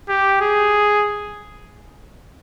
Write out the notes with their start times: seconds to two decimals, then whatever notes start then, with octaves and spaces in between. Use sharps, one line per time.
0.09 G4
0.41 G#4